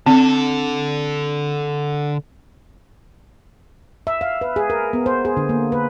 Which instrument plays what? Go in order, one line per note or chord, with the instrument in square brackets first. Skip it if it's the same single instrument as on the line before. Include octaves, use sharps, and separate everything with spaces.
[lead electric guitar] D3 A4 [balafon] C4
[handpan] E5
F5
B4
G#4
A#4
B3
C5
G#4
D3
A#3
B4